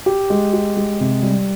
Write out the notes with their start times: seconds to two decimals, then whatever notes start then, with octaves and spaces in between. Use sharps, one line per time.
0.06 G4
0.30 G#3
0.53 G4
0.77 G#3
1.00 C3
1.23 G3